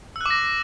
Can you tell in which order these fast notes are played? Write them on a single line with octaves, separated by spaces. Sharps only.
E6 F#6 D6 A#6